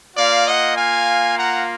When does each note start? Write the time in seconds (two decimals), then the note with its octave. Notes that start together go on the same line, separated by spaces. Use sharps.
0.15 A#3 F4 D5 F5
0.46 D#5 F#5
0.75 F5 G#5
1.35 F#5 A#5